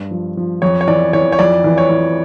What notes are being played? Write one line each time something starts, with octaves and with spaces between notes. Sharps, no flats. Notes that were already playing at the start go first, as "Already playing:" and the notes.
Already playing: G2
F3
F3
F2 C#5
C#5
E3 D5
E3 C#5
C#5
F2 D5
E3
C#5
E3